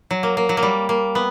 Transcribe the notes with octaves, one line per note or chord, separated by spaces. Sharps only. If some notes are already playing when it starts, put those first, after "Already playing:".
F#3
A#3
A#3
F#3
A#3
G3
A#3
B3